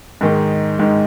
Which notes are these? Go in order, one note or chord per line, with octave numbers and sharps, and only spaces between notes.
G#2 D#3 G#3
G#2 D#3 G#3